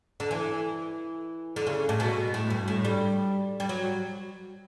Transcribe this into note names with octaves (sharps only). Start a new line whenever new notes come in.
D3
E3
D3
C#3
A2
B2
A2
G2
A2
G3
G3
F#3